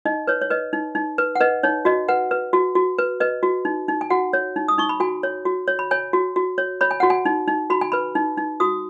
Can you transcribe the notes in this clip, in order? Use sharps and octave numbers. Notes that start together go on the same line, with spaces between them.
D#4 D#5
B4 C#5
C#5
B4 D#5
D#4
D#4
B4
F#5
B4 D#5
D#4 C#5
F#4 D#5
B4 F#5
B4
F#4
F#4
B4
B4 D#5
F#4
D#4
D#4
G#5
F#4 F#5
C#5
D#4
D#6
D#4 C#6
B5
F#4 G#5
C#5
F#4
C#5
B5
C#5 G#5
F#4
F#4
C#5
C#5 B5
G#5
F#4 F#5
G#5
D#4
D#4
F#4 B5
G#5
B4 B5
D#4
D#4
F#4 D#6